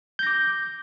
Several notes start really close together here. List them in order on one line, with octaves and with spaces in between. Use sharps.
G6 A#6 D6